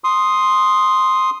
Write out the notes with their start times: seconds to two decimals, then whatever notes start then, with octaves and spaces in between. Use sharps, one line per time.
0.04 C6 D#6